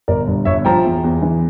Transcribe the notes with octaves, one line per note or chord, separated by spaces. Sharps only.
G1 A#4 D5
G2
G1 C#5 E5
F3 G5 A#5
E2
E2
E3